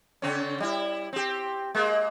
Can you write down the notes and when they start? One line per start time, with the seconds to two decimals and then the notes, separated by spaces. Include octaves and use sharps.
0.22 C#3 C4 C#4
0.60 G3 E4
1.13 C4 G4
1.75 G#3 A#3